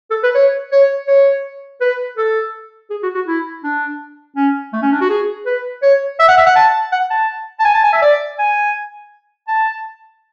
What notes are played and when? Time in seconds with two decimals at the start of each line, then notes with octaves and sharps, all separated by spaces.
0.11 A4
0.23 B4
0.35 C#5
0.72 C#5
1.08 C#5
1.81 B4
2.18 A4
2.90 G#4
3.03 F#4
3.15 F#4
3.27 E4
3.64 D4
4.37 C#4
4.73 A3
4.82 C#4
4.92 D4
5.01 F#4
5.10 G#4
5.46 B4
5.82 C#5
6.19 E5
6.28 F#5
6.37 E5
6.46 F#5
6.56 A5
6.92 F#5
7.11 A5
7.60 A5
7.65 G#5
7.74 A5
7.84 G#5
7.93 E5
8.02 D5
8.39 G#5
9.48 A5